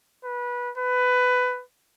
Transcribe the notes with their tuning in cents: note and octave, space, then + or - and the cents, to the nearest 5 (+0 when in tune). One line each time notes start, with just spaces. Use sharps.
B4 -20
B4 +15